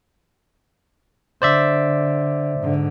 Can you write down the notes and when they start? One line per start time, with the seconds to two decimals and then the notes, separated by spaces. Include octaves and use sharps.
1.42 D3 C5 D5 E5
2.59 G#2 D3